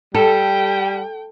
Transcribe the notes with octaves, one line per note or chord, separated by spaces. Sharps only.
G3 A4 G5